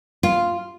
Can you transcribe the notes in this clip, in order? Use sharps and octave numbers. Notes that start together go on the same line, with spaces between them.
F4